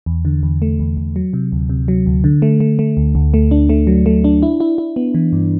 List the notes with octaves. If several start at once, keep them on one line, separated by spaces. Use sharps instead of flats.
E2
D3
E2
A3
E2
E2
F#3
C3
D2
C3
F#3
D2
D3
A3
A3
A3
D2
D2
A3
D4
A3
F#3
A3
D4
E4
E4
E4
B3
E3
G2